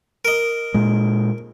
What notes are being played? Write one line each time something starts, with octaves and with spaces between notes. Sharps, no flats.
A#4 D#5
A#2 G#3